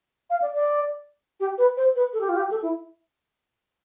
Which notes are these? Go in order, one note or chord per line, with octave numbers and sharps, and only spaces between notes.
F5
D5
D5
G4
B4
C5
B4
A4
G4
F4
G4
A4
E4